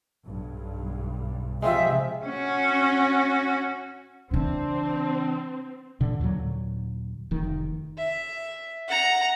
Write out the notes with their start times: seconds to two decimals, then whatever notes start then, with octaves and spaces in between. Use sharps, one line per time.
0.25 B1 G2
1.62 C3 F3 G#3 C4 F4 E5
2.26 C#4 F#4
4.31 C#3 E3 C4 D4
6.00 A#2 D3
6.19 D#2 A#2 D3 F#3
7.31 F1 D#3
7.98 E5
8.88 F#5 A#5